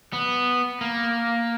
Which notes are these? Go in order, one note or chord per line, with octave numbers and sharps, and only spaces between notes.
B3
A#3